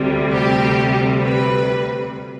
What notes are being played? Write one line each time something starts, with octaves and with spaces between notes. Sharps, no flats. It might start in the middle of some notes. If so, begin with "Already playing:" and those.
Already playing: D2 C3 G3
G4
B4